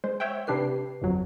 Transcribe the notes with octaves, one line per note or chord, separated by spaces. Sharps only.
G#3 C5
C#5 E5 F#5 G5
C3 D4 G4 B4 C7
G1 F2 F#3